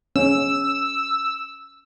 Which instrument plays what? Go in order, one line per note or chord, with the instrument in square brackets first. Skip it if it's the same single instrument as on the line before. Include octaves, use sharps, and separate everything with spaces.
[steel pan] C#4 [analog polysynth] E6